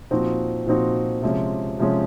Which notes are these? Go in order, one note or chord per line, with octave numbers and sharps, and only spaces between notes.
A#2 F3 C4 D#4 F#4
A#2 F3 C4 D#4 F#4
C3 F3 G#3 C#4
C3 F3 G#3 C#4